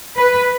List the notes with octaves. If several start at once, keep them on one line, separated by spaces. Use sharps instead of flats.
B4